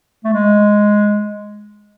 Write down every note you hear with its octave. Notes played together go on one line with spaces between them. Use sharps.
A3
G#3